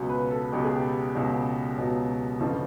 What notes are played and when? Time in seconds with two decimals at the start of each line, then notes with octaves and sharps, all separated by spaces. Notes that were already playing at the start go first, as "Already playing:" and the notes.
Already playing: C#2 B2 F#3
0.09 B4
0.31 A4
0.52 C#2 B2 F#3 G4
0.64 G#4
0.76 G4
1.15 C#2 B2 F#3
1.77 C#2 B2 F#3
2.40 G1 F2 C#3 F3